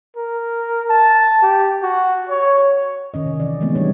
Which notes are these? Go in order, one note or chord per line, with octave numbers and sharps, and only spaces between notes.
A#4
A5
G4
F#4
C#5
D#3 C#4 D#5
C3
E3 D5
D3 E3 G#3 A3 B3 C4
G3 D4 D#4 C#5